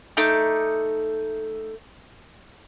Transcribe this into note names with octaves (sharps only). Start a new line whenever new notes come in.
A3 D#4 D6